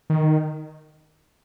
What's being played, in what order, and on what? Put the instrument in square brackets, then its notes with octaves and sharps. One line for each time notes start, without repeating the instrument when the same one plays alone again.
[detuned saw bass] D#3